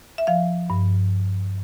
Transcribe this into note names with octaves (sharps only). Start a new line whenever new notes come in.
E5
F3 F5
G2